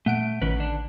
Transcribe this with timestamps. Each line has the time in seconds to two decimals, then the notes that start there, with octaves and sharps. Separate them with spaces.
0.06 A#2 A3 F#5 D7
0.42 A1 D#3 C#4 B4
0.56 D3 D4